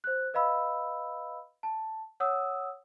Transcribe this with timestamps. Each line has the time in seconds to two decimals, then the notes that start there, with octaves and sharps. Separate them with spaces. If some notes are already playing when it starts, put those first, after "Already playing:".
0.04 C5 F#6
0.34 B4 D#5 F5 B5 E6
1.63 A5
2.20 C#5 F#5 D#6 E6